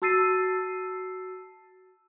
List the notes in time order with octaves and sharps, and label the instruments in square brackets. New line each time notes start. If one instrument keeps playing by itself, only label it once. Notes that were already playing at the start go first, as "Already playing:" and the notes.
[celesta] F#4 A5 E6 A6 C7 D#7